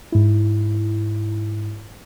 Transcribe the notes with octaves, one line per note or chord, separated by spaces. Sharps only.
G#2 E4